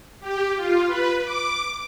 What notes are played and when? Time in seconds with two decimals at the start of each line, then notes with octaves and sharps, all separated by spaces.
0.20 G4
0.55 F4
0.86 B4
1.24 D6